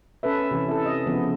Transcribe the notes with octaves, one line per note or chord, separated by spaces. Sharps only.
C#4 A4 B4 E5
C3 E3
E4 A4
D#5
C#3 F3 B3